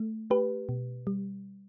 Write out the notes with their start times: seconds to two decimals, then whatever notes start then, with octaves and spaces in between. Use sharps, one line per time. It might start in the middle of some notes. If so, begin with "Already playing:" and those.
Already playing: A3
0.30 A3 G4 B4
0.69 B2
1.07 G3